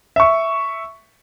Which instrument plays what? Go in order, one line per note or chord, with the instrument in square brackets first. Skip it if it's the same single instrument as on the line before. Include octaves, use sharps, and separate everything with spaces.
[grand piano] E5 C#6